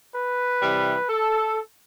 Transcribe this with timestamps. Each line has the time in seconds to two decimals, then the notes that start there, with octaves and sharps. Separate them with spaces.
0.14 B4
0.61 C3 E3 G3
1.09 A4